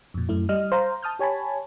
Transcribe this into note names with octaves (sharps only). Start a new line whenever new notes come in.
F2 A#2
F#2 A3 E4
G3 D#5 D#6 F6
C5 F5 A#5
A5 D#6 F6 G6
G4 C#5 G#5 A5 B5